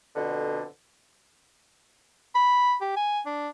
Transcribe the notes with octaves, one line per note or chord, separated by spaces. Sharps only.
F2 B2 D3
B5
G4
G#5
D4